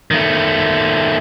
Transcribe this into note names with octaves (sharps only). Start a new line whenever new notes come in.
D#3 A3